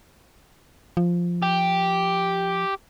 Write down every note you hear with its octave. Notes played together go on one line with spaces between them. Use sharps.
F3
G4